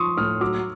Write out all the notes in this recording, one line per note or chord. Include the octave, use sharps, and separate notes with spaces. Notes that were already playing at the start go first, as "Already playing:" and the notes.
Already playing: F3 C6 C#6 D#6
A2 D#6 F6
F#3 D6 E6